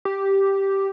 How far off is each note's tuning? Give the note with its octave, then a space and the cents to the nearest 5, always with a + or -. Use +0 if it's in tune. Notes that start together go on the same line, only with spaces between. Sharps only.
G4 -5